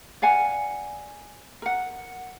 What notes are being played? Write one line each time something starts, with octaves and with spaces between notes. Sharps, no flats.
D5 F5 F#5 G#5
A#4 F#5